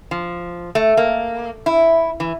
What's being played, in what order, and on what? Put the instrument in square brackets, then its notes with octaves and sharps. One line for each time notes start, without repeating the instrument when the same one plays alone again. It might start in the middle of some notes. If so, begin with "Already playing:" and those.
[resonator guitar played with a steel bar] F3
A3
A#3
E4
E3